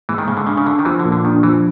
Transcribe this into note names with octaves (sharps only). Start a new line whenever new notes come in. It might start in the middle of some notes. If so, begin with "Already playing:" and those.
G#2 E3
D#3
G#2 C#3
D3
C#3 D4
C#3
D3 D4
D#3
E3 F3
D3
A#2
D3
D#3 D4
E3 F3